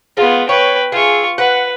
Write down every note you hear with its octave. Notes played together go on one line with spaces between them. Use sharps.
G#3 B3 F4
B4 C#5 G5
F4 G#4 E5 C#6
B4 F#5